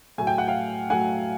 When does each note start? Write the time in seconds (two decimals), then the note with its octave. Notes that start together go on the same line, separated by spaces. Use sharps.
0.18 A2 F#3 A3 G#5
0.27 G5
0.38 F#5
0.48 F5 G5
0.90 A2 F#3 A3 F#5 G#5